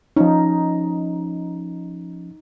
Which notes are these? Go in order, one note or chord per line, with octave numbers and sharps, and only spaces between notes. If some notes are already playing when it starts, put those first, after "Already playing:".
F3 C#4 D#4